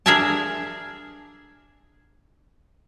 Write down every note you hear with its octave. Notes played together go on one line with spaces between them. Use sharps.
D4 G#4 A#4 E5 G#5 A5